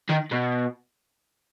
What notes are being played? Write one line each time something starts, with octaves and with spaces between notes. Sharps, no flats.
D#3
B2